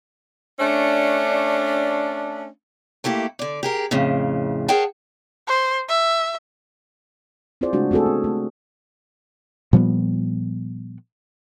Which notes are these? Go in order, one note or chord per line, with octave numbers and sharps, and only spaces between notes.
A3 C#4 D4
A3 A#3 E4 G4
D3 D5
G4 G#4 A#4
F2 A2 C#3
G#4 A#4 C#5 F#5 G5 A5
C5
E5
C4 E4 F4 G#4 C5 D5
C#3 G#3 A3 D4 F#4
A3 C4 F#4 G#4 A4
B3
A3
A#2 F3 G3 B3